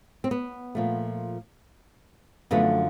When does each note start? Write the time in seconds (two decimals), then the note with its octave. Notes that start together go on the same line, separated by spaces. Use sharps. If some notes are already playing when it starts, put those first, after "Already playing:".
0.24 C4
0.31 B3
0.75 A#2 F3 A3
2.51 F#2 D3 F3 A3 B3